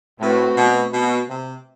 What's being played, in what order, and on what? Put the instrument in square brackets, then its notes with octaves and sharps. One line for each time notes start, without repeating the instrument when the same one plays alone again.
[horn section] A2 [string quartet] A3 C4 F#4 B4
[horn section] B2
B2
C3